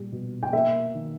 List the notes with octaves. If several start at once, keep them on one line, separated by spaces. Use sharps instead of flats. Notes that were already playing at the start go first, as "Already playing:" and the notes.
Already playing: A#2 G3
B2
G5
A#3 E5
D#3